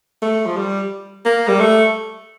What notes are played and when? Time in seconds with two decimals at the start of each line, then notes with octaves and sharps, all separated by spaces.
0.22 A3
0.46 F3
0.57 G3
1.25 A#3
1.48 G3
1.60 A3